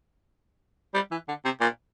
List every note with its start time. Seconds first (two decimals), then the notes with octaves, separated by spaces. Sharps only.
0.94 G3
1.11 E3
1.28 D3
1.45 C3
1.60 A#2